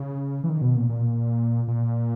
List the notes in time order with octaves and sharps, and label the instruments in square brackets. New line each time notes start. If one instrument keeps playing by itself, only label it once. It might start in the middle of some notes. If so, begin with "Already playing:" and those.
Already playing: [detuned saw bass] C#3
E3
D#3
B2
A#2
A#2
A#2